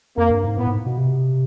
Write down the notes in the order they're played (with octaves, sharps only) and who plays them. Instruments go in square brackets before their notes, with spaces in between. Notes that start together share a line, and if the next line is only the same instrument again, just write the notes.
[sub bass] F2 [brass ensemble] A#3
[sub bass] G2
G#2
[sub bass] A2 [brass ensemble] B3
[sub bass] G#2
B2
C3